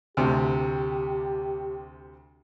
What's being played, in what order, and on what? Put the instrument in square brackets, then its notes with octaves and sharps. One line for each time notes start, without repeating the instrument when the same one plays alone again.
[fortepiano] D2 C3 [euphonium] G4